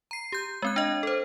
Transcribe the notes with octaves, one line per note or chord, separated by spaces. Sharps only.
A#5 C7
G4 G6
G#3 C4 F#6
D4 D#5
A4 C5